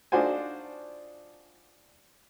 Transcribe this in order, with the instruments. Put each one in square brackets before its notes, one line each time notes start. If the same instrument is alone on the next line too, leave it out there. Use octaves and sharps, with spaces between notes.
[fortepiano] D4 D#4 F4 F#4 C5 G#5